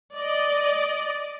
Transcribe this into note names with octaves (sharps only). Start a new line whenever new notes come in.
D5 D#5